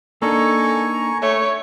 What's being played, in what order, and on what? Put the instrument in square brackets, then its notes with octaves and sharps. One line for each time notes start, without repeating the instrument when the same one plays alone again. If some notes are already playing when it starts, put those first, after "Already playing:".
[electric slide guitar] A#3 D4 D#4 [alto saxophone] A4 [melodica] G#5 A#5 C#6
[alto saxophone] A3 [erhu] C#5